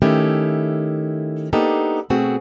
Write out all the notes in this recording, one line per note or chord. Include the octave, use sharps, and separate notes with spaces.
D#3 A3 C#4 E4 G4
A#3 B3 D4 D#4 G4 A4
B2 A3 C4 F#4 G#4